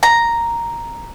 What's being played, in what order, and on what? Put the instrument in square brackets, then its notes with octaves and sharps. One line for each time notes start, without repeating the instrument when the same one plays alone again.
[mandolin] A#5